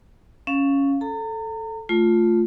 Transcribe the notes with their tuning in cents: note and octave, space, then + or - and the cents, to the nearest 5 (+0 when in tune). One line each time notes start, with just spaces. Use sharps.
C#4 +0 F5 +0
A4 -5 A#5 -35
A3 +0 F4 +0